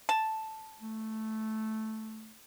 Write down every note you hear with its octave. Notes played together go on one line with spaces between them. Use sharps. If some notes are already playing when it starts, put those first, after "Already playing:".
A5
A3